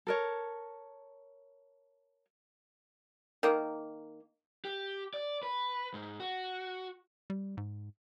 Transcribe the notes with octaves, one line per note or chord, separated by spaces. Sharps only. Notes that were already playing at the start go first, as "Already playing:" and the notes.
A4 A#4 C#5
D#3 A#3
G4
D5
B4
G#2
F#4
G3
G#2